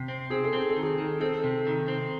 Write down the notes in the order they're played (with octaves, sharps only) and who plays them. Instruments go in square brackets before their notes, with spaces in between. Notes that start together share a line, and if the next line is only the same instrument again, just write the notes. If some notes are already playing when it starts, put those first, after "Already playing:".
Already playing: [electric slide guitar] C3
C4
[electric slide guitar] C4 [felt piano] G#4
[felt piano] A4
[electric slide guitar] C4 [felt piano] G#4
[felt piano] A4
[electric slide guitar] D#3
[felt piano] G#4
[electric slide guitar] D#3
[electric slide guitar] C4 [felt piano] A4
[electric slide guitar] C3
D#3
C4